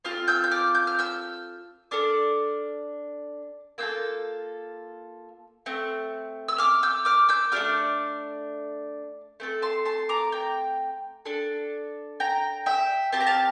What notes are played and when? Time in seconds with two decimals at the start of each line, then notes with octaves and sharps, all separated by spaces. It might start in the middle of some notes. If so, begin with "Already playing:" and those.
0.05 C4 F4 A4 F6
0.28 E6 G6
0.44 G6
0.51 D6 F6
0.75 G6
0.87 F6
0.99 E6 G6
1.91 D4 A4 D6 F6
3.78 A#3 F4 A4 E6 G6
5.66 A3 C4
6.48 E6
6.58 D6 F6
6.83 E6 G6
7.05 D6 F6
7.29 E6 G6
7.52 A3 D4 G4 D6 F6
9.40 A3 C4 A4
9.62 A5 C6
9.85 A5 C6
10.09 A#5 D6
10.32 G5 A#5
11.25 D4 A4
12.20 G5 A#5
12.66 E5 G5
13.12 C4 G4 A5
13.21 A#5
13.27 F5 A5